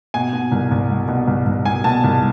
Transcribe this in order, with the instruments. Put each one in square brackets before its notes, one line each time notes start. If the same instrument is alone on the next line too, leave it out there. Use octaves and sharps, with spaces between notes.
[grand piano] B2 G#5
B2
C2
C2
B2
B2
C2
C2
B2 G#5
B2 A5
C2